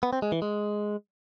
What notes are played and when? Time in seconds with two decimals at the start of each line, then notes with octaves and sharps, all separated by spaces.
0.03 B3
0.13 C4
0.22 G#3
0.32 E3
0.42 G#3